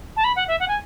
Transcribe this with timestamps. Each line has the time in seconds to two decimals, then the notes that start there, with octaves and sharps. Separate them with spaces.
0.17 A5
0.24 B5
0.36 F#5
0.48 E5
0.60 F#5
0.68 G#5